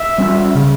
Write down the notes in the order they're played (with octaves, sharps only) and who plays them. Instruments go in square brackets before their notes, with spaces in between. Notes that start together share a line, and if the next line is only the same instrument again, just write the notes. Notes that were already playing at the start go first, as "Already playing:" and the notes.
Already playing: [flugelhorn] E5
[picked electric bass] G3 C#4
C#3